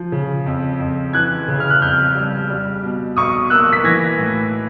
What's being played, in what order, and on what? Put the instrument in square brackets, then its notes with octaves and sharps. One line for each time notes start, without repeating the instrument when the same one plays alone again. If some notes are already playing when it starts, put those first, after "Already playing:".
Already playing: [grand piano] F3
C#3
F2
F2
E3 F#6 G#6
C#3
F6
F#6
F2 F6 G6
G3
G3
B2
B1 C#6 D#6
A#3 E6 F#6
B6
E3 G#6 A#6
A2